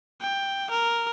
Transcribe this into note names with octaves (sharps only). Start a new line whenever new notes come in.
G5
A#4